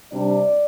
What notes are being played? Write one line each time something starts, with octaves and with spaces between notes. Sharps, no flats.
C3 G3 D4 D5